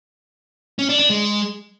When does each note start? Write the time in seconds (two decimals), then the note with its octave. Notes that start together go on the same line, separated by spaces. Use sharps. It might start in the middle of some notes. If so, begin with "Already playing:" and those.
0.79 C#4
0.89 D4
0.99 D4
1.10 G#3